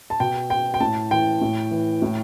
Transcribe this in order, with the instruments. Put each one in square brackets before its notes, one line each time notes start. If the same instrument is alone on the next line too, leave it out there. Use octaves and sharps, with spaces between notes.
[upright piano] A5
B2 G5
G5
G5
A2 A5
E3 G5
A2
E3
A2